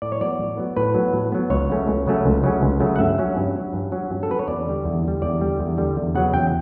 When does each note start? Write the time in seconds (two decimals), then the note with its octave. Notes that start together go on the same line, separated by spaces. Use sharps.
0.02 A2 D5
0.12 C#5
0.21 F#3 B3 D5
0.39 A2
0.57 F#3 B3
0.77 A2 B4
0.94 F#3 B3
1.13 A2
1.32 F#3 B3
1.50 C#2 C#5
1.70 C#3 F#3 A3 C#4
1.88 C#2
2.07 C#3 F#3 A3 C#4
2.26 C#2
2.43 C#3 F#3 A3 C#4
2.63 C#2
2.80 C#3 F#3 A3 C#4
2.96 F#5
2.99 G2 E5
3.18 F#3 C#4
3.37 G2
3.56 F#3 C#4
3.73 G2
3.92 F#3 C#4
4.11 G2
4.23 A4
4.29 F#3 C#4 B4
4.39 C#5
4.48 E2 D5
4.66 D3 G3
4.85 E2
5.03 D3 G3
5.22 E2 D5
5.41 D3 G3
5.59 E2
5.78 D3 G3
5.96 E2
6.15 C#3 F#3 B3 F#5
6.34 E2 G5